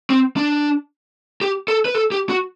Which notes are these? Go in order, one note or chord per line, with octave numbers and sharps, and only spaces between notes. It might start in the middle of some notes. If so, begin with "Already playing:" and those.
C4
D4
G4
A4
B4
A4
G4
F#4